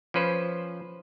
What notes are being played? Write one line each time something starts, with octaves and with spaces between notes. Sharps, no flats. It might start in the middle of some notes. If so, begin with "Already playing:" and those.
F3 C#4 B4 C5